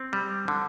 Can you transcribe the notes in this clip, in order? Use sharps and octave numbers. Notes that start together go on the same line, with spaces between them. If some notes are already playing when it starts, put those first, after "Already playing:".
Already playing: C4
G3
D3